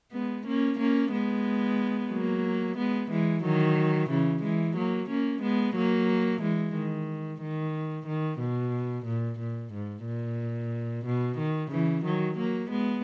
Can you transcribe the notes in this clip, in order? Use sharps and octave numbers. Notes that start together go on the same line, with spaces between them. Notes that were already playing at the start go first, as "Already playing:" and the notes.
G#3 B3
A#3 C#4
A#3 C#4
G#3 B3
F#3 A#3
G#3 B3
E3 G#3
D#3 F#3
C#3 E3
E3 G#3
F#3 A#3
A#3 C#4
G#3 B3
F#3 A#3
E3 G#3
D#3
D#3
D#3
B2
A#2
A#2
G#2
A#2
B2
D#3
C#3 E3
D#3 F#3
F#3 A#3
G#3 B3